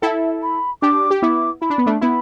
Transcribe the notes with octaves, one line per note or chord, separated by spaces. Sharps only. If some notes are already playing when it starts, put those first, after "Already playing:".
E4 A4 E5 G5
B5
D4 G4 D6
G4
B3 E4 D6
E4 B5
D4
B3
A3 D4
B3 E4 B5